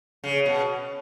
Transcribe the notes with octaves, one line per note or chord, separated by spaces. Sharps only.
C#3
B2